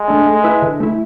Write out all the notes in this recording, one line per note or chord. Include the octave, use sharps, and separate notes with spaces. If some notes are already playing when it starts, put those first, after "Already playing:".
Already playing: G#3
A3 D4
A3
E4 B4 E5
D3
A3 E4